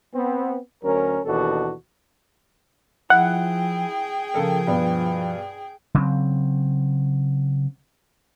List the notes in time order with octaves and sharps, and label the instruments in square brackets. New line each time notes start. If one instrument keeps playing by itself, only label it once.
[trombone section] B3 C4
D2 F#3 C#4 A#4
D#2 B2 E3 D4 F#4 A4
[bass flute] F3 [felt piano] E4 [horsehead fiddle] G#4 G5 [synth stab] F#5
[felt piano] C#3 A4 A#4 [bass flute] F3
[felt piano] G2 B2 B3
[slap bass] C#3 F#3 C4